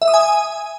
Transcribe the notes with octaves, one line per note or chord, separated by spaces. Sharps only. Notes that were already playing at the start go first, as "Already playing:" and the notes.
E5
D#6
G#5